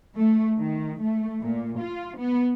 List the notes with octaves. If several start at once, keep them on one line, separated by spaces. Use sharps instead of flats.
A3
D#3
A3
A#2
F4
B3